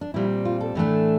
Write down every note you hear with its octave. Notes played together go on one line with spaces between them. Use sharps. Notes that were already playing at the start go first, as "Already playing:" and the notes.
D4
A#2 G3 C4 E4
F4
A4
A2 E3 A3 D4